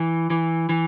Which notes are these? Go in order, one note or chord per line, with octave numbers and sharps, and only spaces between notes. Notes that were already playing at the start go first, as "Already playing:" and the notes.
Already playing: E3
E3
E3